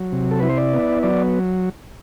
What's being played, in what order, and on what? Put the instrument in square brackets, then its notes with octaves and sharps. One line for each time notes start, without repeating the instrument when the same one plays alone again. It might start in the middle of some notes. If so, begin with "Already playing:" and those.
Already playing: [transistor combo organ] F#3
C3
A4
E4 B4
C5
D5
B3
F#3 D5